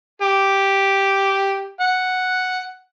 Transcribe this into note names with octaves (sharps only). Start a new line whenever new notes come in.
G4
F#5